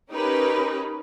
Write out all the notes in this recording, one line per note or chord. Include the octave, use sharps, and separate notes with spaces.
C#4 D#4 G4 A#4 B4